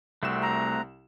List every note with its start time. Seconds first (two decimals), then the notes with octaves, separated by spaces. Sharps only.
0.23 C2 A3 C4 F#4 E7
0.42 A#5